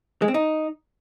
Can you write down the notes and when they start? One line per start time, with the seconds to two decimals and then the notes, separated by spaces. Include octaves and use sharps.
0.22 G#3
0.28 C4
0.34 D#4